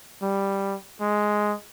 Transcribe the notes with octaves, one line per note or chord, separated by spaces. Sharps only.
G3
G#3